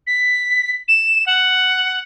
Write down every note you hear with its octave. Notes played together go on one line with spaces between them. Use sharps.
B6
E7
F#5